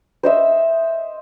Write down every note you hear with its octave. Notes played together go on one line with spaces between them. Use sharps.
C5 D#5 E5